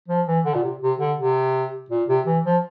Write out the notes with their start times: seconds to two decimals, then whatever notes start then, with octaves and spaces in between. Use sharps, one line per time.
0.08 F3
0.27 E3
0.45 D3
0.55 A#2
0.63 C3
0.81 C3
1.00 D3
1.17 C3
1.90 A#2
2.09 C3
2.26 E3
2.44 F3